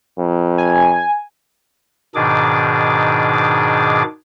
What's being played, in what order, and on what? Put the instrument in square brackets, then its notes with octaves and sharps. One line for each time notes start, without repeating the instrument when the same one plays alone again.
[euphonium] F2
[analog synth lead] G#5
[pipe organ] G#2 B2 D#3 D4 G#4 D6